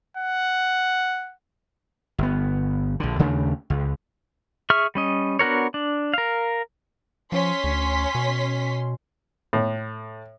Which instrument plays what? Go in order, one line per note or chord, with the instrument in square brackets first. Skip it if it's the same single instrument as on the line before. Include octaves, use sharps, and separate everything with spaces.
[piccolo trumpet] F#5
[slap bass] G1 B3
A#1 D3
D#2 C#3 A3 D4
C#2
[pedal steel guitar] G#4 E5 C#6 F6
G3 C#4 D#5
B3 D4 F#4 A#4 C#5
D4
A#4 F5
[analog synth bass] F3 [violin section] C#4 C6 B6
[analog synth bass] D2
B2
[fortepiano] A2